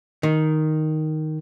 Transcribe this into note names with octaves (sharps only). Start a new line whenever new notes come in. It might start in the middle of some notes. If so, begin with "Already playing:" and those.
D#3